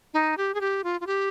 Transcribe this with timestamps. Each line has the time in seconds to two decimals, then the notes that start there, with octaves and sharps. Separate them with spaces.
0.14 D#4
0.37 G4
0.54 G#4
0.61 G4
0.84 F4
1.01 F4
1.07 G4